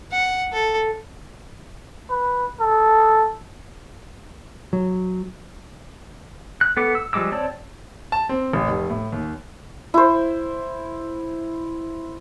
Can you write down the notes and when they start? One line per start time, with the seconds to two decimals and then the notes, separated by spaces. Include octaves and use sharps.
0.12 F#5
0.53 A4
2.10 B4
2.60 A4
4.73 F#3
6.61 F#6
6.77 B3 A4 D6
6.95 E6
7.13 F3 G3 G#3 D6 E6
7.32 C4 C#5 D5 A5 E6
8.12 A5
8.29 C4
8.53 A1
8.67 F1
8.90 A2
9.12 D#2
9.94 E4 C5